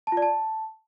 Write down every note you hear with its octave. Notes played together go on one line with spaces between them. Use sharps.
A5
F4
D5
A5